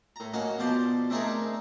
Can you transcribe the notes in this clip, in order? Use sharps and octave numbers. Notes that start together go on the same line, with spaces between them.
A2 A#5
A#3 C#4 F#4 D#5
B2 F3 C5 D5
A3 C4 D4 D#4 G#4 A#4